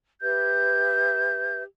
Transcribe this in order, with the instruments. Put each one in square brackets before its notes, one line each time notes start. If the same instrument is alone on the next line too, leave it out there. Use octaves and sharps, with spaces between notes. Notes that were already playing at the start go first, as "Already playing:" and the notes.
[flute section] G4 B4 E5 G6